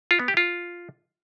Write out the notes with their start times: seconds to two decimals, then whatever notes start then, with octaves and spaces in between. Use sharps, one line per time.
0.11 F4
0.19 B3
0.28 G4
0.37 F4